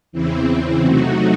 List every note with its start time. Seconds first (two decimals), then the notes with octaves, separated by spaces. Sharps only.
0.12 E2 C#3 E3 C4 E4
0.83 C3 F#3 A3 D#4 F#4